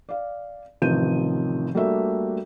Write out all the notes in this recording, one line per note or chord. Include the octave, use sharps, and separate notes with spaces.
D5 F5
A1 C3 D#3 F3 G6 D#7
G3 A3 A#3 D4 F#4 E5